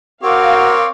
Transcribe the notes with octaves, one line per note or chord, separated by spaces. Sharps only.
C4 F#4 A#4 C#5 F5 D6